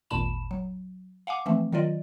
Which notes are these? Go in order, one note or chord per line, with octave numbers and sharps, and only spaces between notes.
G#1 D#2 A#2 A5 B5 E7
F#3
F5 F#5 G#5 D6
E3 F3 A3 C4
D#3 F#3 F4 D5 D#5